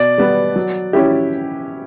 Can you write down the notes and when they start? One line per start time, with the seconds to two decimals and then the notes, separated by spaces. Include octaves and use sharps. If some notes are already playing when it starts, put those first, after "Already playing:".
Already playing: B2 D5
0.18 G3 B3
0.56 F#3
0.93 C#4 E4 G4